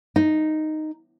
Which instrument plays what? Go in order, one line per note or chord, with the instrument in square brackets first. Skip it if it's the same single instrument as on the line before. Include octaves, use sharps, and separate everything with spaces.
[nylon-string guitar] D#4